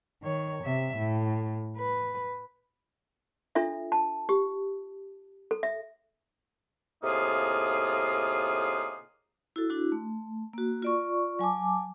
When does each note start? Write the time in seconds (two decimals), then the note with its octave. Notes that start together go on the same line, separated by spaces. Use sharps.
0.22 D#3 C#5
0.64 C3 E5
0.98 A2
1.77 B4
3.55 D4 F4 A4 E5
3.92 A5
4.29 G4
5.51 A4
5.63 E5
7.03 A2 C3 A#3 D#4 F4 G#4
9.56 E4 F#4 A4
9.70 D4 E4 F#4
9.92 A3
10.53 A#3 F#4
10.82 F4 D5 C#6
11.39 F#3 G#5 A5 D6